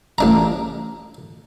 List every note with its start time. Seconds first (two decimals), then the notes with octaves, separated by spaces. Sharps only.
0.18 A1 D4 A#5